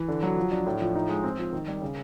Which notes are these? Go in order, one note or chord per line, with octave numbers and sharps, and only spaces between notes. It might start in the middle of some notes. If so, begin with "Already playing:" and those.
Already playing: E3
D3
F#3
F3
D4
A2
F3
D#4
G#3
C4
F3
D#3
G3
C#3